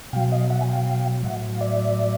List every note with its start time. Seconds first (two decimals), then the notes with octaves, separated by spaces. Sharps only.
0.13 B2 F#3 F5 G5
0.32 D#5 F5
0.50 E5 F#5
0.61 G#5
0.69 F5 G5
1.23 A2 F#3 E5 F#5
1.55 F5
1.61 D5 E5